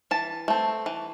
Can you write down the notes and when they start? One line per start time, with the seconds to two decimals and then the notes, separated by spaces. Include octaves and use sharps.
0.11 E3 A5
0.48 A3 C4
0.86 E3